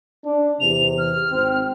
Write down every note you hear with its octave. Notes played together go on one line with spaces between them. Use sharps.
D4
E2 C3 F7
F6
G#1 C4